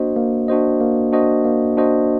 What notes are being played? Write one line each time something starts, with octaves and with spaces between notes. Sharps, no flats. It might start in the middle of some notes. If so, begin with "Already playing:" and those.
Already playing: A#3 D4 F#4 C5 D#5
A#3
D4 F#4 C5 D#5
A#3
D4 F#4 C5 D#5
A#3
D4 F#4 C5 D#5